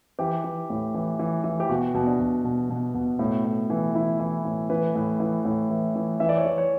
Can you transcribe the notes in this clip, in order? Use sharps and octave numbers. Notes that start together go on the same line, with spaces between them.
E3 G4
E3
A2
E3
E3
E3
G4
B2 F#4
B2
D4
B2
B2
B2
B2
A2
A2
E3
E3 E4
E3
A2
E3 B4
A2
E3
A2
E3
E3
E3 E5
D5
C#5
E3 D5
C#5